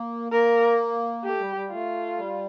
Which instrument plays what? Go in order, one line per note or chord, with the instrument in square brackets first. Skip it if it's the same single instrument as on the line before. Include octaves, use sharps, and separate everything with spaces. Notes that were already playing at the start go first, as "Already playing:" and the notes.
Already playing: [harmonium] A#3
[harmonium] A#3 [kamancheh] A#4
[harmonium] A3 [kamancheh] G4
[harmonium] G3
G3
[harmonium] A3 [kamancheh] F4
[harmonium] G3